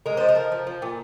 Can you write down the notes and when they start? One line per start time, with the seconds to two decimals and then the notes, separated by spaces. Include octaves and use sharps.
0.06 G#3 A#4
0.17 F3 C5
0.29 A#4
0.35 F3
0.52 F3
0.67 F3
0.82 A#2